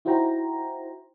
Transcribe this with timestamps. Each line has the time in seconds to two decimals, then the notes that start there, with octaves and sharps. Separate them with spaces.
0.05 D#4 E4 F#4 C5 G5 A#5